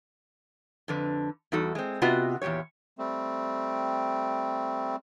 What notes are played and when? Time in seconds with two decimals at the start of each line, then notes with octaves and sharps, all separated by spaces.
0.88 F2 D3 B4
1.52 E2 G3 D#4 F#4 A4
1.75 G#3 C4
2.02 C3 B3 F4 F#4 B4 D#5
2.42 E2 A#2 G3 G4 C#5
2.98 G3 A3 C4